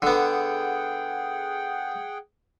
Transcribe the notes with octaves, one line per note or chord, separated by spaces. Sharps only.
D3 B3 G#4 F#5 G5